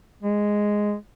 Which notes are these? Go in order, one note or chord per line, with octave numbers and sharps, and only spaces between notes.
G#3